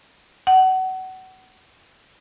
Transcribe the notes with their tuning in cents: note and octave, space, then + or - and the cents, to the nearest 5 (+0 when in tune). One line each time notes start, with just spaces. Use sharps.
F#5 +25